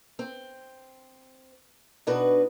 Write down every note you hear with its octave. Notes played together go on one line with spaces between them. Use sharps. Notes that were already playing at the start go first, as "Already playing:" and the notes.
C4
B2 D4 D#4 F#4 B4